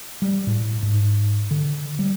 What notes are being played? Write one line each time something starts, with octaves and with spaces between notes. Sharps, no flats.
G3
A2
G#2
D3
G3